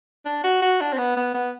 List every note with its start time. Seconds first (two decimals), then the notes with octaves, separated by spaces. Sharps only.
0.25 D4
0.43 F#4
0.62 F#4
0.81 D4
0.92 C4
0.98 B3
1.17 B3
1.34 B3